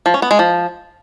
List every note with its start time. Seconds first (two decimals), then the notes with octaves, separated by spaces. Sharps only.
0.06 F3
0.14 C#4
0.22 B3
0.31 G#3
0.39 F3